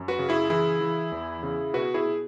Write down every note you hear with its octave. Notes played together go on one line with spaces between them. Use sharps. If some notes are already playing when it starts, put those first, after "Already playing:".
Already playing: F#2
F#4 B4
C#3
E4 G#4
E3 E4 G#4
E3
E2
C#3
B2 F#4 B4
E4 G#4
B2